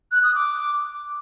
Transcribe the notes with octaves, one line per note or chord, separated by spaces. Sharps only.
F#6
D#6
D6